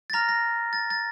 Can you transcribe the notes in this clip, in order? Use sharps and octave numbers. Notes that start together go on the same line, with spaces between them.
A6
A#5 F6 A#6
A#6
A6
A6